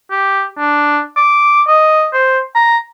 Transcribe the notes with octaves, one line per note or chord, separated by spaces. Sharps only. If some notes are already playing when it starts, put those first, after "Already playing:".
G4
D4
D6
D#5
C5
A#5